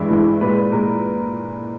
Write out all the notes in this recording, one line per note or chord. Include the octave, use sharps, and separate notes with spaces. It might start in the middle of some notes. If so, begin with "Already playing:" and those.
Already playing: G2 E3 G#3 E4
G2 E3 G#3
A#2 G#3 B4
B4
A#2 G#3 A#4